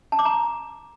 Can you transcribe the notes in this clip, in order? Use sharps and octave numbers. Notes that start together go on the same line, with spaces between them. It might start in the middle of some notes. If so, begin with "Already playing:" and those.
A5
D6
A#5